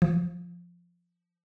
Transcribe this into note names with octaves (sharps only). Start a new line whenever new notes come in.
F3